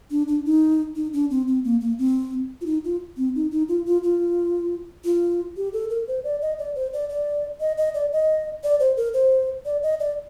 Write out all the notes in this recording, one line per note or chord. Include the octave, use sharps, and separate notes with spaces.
D4
D4
D#4
D#4
D4
C4
C4
A#3
A#3
C4
F4
D#4
F4
C4
D#4
D#4
F4
F4
F4
F4
G4
A4
A#4
C5
D5
D#5
D5
C5
D5
D5
D#5
D#5
D5
D#5
D5
C5
A#4
C5
D5
D#5
D5